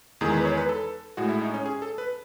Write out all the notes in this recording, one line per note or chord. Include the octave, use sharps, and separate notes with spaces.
E2 D#3 G#3 G#4
B4
C#5
B4
A4
A2 G#3 F#4
E4
D#4
C#4
G#4
A4
B4